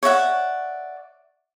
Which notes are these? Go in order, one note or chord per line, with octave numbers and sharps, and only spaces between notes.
C#5 D5 E5 F#5